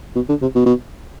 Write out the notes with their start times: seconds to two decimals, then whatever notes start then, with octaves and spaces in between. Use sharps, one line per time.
0.15 B2
0.29 D3
0.42 C3
0.55 B2
0.66 B2